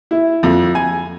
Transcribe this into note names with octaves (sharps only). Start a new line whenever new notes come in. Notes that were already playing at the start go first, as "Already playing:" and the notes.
E4
F2
G#5